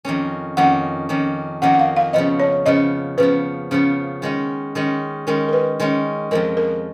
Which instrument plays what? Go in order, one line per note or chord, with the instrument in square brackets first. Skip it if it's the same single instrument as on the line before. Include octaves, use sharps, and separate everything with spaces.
[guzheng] F2 D#3 A#3 C#4
[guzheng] F2 D#3 A#3 C#4 [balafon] F#5
[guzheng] F2 D#3 A#3 C#4
[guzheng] F2 D#3 A#3 C#4 [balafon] F#5
[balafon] F#5
F5
F5
[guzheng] C#3 F3 B3 [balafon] D#5
[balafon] C#5
[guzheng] C#3 F3 B3 [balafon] D#5
[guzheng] C#3 F3 B3 [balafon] B4
[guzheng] C#3 F3 B3
D#3 G#3 C#4
D#3 G#3 C#4
[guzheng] D#3 G#3 C#4 [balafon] A#4
[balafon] A#4
B4
[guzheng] D#3 G#3 C#4
[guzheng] F2 F3 G#3 [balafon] A#4
[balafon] A#4